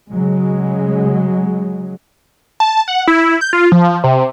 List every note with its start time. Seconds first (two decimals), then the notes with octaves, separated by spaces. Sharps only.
0.11 C#3 F#3 G#3
2.60 A5
2.88 F#5
3.07 E4
3.41 G6
3.53 F4
3.72 F3
4.04 C3